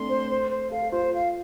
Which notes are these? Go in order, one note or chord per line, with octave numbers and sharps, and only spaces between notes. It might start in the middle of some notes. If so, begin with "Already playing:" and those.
Already playing: A3 C4 D4 C6
C5
C5
C5
A4 F5
A4
F4 C5
F4
F5